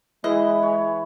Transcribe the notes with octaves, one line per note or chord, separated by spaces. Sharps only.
E3 G#3 E4 B4 D#5
G#4 B4 C#5